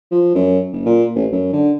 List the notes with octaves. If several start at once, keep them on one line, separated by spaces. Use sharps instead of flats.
F3
F#2
F#1
A#2
A1
F#2
D3